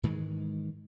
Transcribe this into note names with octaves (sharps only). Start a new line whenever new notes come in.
G#2 D#3 E3 G#3